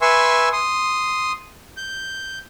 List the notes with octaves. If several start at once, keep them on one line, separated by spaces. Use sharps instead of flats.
B4 E5 G#5 C6 C#6 E6
C6 D#6
G6